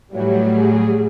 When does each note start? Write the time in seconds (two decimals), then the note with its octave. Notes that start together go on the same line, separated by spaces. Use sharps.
0.13 A2 E3 F#3 G3 F#4 C#5
0.58 G#4